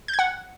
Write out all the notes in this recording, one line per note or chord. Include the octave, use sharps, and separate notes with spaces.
G6
G#6
F#5